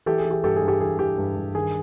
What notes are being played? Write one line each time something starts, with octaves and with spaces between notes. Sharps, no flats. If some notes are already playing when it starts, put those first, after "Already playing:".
E3 G4 A4
G#4
E3
G4
G2 G4 A4
G#4
G2
G4 A4
E3 G#4
E3 G4
G2
G2
D#3 G#4